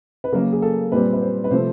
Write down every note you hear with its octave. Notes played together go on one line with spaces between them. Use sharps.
B4
C#3 F#3 A#3 A#4
G#4
A4
A#2 G3 C4 B4
B4
C5
B4
C3 F3 A3 C4 C5